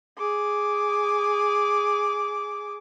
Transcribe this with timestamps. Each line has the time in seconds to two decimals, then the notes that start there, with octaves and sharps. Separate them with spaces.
0.18 G#4 D6